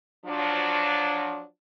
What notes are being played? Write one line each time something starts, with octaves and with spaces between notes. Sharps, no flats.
F3 F#3 D4